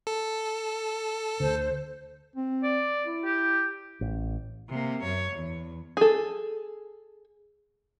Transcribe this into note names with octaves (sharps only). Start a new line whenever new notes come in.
A4
D2 D3 C5
C4
D5
E4
G4
A1
C3 A#3
F#2 C#5
E2
G#4 A4